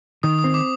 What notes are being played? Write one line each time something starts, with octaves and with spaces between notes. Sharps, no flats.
D#3 D#6
D#6
C4
D6